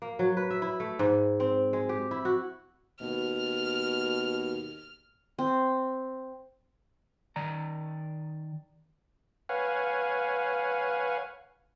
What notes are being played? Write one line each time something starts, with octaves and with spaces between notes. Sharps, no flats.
A#3
F#3
B4
E5
E4
A3
G#2
C4
G#3
G4
E4
F#4
D#2 B2 F6
C4
D#3 D5 A#5
B4 C#5 F5 F#5 G#5